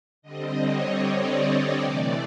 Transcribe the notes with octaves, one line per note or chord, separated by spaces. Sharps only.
D3 G3 C4 D#5
C#5
D5
C3 E3 A3